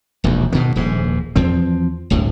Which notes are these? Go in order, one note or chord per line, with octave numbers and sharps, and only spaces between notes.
E1 A#1 D#2
G#2 B2 D#3 A#3
D#1 A#1 G#2
E2 F3 C4
D1 G1 D2 A2